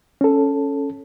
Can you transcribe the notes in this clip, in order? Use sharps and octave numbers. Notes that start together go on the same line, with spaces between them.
C#4 A4